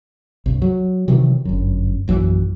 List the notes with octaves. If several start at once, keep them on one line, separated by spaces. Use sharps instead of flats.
C2 G2
F#3
C3 D#3 E3 F#3
G1 F#2
A#1 F#2 C#3 E3